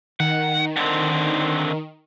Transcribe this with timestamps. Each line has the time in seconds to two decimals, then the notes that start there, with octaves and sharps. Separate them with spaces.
0.20 D#3 F#5
0.76 D3 C4